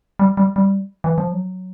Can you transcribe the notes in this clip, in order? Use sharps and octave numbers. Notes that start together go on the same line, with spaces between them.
G3
G3
G3
E3
F3
F#3